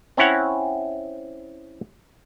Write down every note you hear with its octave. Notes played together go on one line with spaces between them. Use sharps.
C4 C#4 E4 C#5 F#5